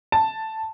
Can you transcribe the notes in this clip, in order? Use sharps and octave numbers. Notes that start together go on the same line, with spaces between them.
A5